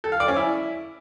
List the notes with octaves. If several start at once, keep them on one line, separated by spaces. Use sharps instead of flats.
A4
F5
D5
C#4
E4